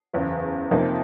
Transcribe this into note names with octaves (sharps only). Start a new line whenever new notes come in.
F#1 E2 C#3
F2 C3 F3 A#3 D#4